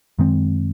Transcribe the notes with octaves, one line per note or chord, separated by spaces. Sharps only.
F#2 D#3 G#3 C4